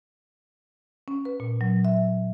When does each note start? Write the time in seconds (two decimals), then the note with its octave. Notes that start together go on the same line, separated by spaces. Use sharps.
1.08 C#4
1.25 B4
1.40 A#2
1.61 F#3
1.85 E5